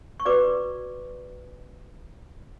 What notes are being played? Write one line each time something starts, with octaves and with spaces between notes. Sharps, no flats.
C#6
F#4 B4 D5 D6